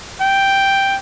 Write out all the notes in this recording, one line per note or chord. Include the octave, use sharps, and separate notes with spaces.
G5